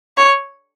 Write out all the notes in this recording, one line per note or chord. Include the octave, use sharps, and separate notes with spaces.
C#5